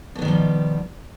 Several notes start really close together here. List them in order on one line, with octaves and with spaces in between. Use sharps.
B2 B3 D#3 F3 G3